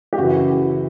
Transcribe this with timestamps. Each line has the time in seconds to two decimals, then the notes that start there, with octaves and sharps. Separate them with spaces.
0.13 G4
0.18 F#2 C#3 E3 F#4